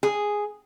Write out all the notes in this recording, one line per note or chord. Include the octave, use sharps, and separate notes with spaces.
G#4